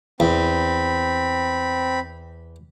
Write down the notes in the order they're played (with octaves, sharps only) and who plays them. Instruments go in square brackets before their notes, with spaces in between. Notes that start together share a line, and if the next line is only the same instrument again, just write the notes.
[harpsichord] E2 [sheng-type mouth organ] C4 B5